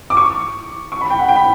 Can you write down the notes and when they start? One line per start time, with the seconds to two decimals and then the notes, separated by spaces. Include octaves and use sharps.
0.10 D6
0.17 C#6
0.92 C#6
1.01 B5
1.10 G5
1.19 F#5
1.28 G5
1.36 B5